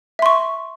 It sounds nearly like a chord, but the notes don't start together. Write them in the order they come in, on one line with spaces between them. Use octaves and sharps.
E5 C6 C#6